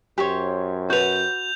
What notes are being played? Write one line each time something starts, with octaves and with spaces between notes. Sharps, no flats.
F#2 G4 C5 C#5
F#4 B4 G6 F7